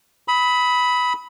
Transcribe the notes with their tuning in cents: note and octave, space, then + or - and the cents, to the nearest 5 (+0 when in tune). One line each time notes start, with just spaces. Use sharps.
B5 +0 D#6 +40